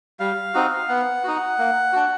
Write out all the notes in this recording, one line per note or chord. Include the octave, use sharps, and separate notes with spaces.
G3 F5
C4 D#4 F#4
B3 F#5
D#4 F#4
A#3
D4 F#4